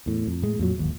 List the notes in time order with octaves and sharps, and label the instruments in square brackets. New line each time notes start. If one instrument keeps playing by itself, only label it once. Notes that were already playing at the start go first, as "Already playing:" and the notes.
[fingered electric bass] E2 A2
F2
A2 G#3
F2 A#2 F#3
D1 G#1 D#2